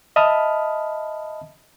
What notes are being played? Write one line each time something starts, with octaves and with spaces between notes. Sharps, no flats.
D#5 E5 A5 B5 D#6 F6